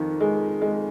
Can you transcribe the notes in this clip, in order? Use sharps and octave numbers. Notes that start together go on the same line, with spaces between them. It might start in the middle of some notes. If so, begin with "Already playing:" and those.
Already playing: F2 D#3
G#3
G#3